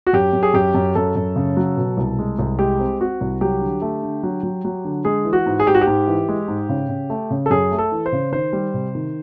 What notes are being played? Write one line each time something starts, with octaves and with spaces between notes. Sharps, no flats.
F#4
F#2 G4
F#2
G#4
F#2 G4
F#2
F#2 A4
F#2
C#3
F#3
B2
C2
G#3
C2
G#3 G4
C4
C4 F#4
C2
F#3 G4
D3
A3
D3
F#3
F#3
F#3
D3
G#3 G#4
E3
F#4
G#2
G#4
G#2 G4
F#4
G4
G#2
E3
G#3
G#2
C#3
C#3
A3
C#3
A4
F#2 G#4
A3
A4
E3
C5
C#3
D#3 C5
G3
C3
D#3